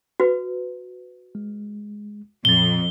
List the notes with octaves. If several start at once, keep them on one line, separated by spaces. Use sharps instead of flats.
F#4 B4
G#3
F2 A#2 A6 G7